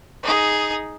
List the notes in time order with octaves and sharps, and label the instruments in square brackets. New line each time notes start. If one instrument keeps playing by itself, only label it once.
[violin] D#4 G#4